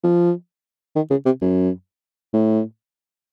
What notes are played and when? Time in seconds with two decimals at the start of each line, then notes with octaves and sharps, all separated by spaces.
0.04 F3
0.96 D#3
1.10 C#3
1.26 C3
1.42 F#2
2.33 A2